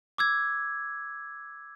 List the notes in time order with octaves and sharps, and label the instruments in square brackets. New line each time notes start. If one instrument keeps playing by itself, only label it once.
[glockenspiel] D6 E6 G#6